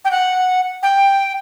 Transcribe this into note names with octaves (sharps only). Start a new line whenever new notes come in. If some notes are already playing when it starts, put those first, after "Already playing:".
G5
F#5
G5